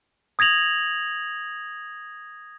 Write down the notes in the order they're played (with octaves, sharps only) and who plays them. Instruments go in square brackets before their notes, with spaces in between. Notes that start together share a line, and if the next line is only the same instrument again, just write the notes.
[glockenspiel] D#6 G#6 A#6 F7 F#7